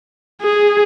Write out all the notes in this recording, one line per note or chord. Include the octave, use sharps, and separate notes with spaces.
G#4